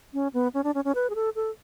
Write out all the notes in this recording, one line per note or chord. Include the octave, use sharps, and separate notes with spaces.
C#4
B3
C#4
D4
C#4
C#4
B4
G#4
A4
A4